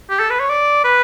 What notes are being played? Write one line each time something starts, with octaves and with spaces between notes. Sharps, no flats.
G4
A4
B4
C#5
D5
B4